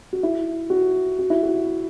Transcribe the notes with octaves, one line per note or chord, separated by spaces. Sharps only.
F#4
E4
F#4
F#4
E4
F#4